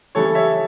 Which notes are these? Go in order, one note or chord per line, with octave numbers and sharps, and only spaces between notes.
C#3 E3 G3 A4 C#5
C#5 E5